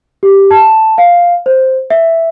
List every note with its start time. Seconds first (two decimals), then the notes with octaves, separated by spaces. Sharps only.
0.23 G4
0.51 A5
0.98 F5
1.46 C5
1.90 E5